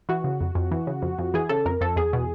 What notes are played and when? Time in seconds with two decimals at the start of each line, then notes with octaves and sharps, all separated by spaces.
0.09 E3 F#4
0.24 C#3
0.41 F2
0.55 F2
0.71 E3
0.87 C#3
1.02 F2
1.18 F2
1.34 E3 G#4
1.49 C#3 A4
1.65 F2 A#4
1.81 F2 A4
1.96 E2 G#4
2.13 B2